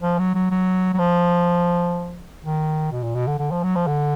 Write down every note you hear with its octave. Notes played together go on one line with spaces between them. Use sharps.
F3
F#3
F#3
F#3
F#3
F3
D#3
B2
A#2
B2
D3
D3
F3
F#3
F3
D3